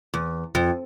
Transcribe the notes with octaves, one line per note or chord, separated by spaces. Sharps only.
E2
F2